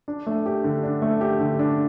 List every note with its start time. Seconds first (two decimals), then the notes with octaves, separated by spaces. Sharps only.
0.08 D4
0.27 A3
0.46 G4
0.64 D3
0.83 D4
1.02 A3
1.21 G4
1.40 D3
1.59 D4